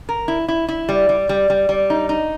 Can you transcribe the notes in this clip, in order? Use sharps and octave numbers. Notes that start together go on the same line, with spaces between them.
A#4
E4
E4
E4
G3
G3
G3
G3
G3
D#4
D#4